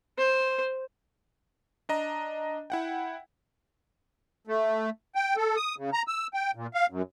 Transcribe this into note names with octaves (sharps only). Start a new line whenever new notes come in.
C5
D4 D#5 A#5
E4 F#5 G5
A3
G5
A4
D#6
C#3
A#5
E6
G5
A#2
F5
F#2